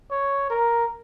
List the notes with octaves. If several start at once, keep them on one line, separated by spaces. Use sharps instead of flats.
C#5
A#4